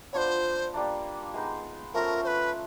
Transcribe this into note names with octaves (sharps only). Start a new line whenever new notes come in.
B3 D4 F4 C5 C#5
G3 A#3 D4
G#3 B3 D#4
F3 A3 C#4 F4 A#4
C5
B4